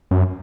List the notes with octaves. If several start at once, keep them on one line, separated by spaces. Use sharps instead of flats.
F#2